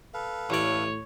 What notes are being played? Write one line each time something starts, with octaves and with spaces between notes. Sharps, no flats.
A4 B4 F5
A1 A2 C#5 D5